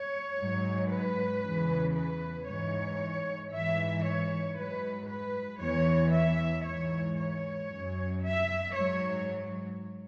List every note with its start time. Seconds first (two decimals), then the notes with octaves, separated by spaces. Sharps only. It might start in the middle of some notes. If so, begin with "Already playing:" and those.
Already playing: C#5
0.38 G#2 F#3
0.90 B4
1.43 E2 C#3 E3
1.94 B4
2.47 G#2 E3 C#5
3.52 G#2 E3 E5
4.04 C#5
4.56 G#2 F#3 B4
5.09 B4
5.61 E2 E3 C#5
6.13 E5
6.66 G#2 E3 C#5
7.18 C#5
7.70 F#2 F#3
8.23 E5
8.75 G#2 F#3 C#5